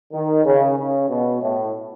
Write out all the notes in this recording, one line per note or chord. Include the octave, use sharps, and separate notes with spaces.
D#3
C#3
C#3
B2
A2